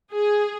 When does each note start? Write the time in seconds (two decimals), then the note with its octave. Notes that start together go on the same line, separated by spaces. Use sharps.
0.11 G#4